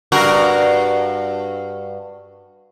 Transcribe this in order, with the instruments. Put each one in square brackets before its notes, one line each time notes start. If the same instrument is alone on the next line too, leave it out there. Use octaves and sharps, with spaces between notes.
[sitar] G2 F#4 A#4